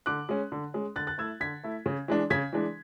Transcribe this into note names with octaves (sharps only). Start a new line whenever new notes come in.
D3 D6 F#6
G#3 C#4
D3
G#3 C#4
D3 F#6 A6
F#6 A6
A3 E4 E6 G#6
D3 G#6 B6
A3 E4
C#3
E3 G#3 D4
C#3 G#6 B6
E3 G#3 D4